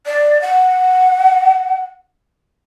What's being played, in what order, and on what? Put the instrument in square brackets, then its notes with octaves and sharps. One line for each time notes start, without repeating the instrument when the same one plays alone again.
[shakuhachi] D5
F#5